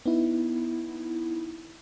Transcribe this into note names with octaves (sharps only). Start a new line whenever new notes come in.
B3 D#4 E4